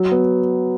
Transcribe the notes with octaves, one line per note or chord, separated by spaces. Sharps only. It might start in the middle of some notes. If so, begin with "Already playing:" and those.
Already playing: F#3
B3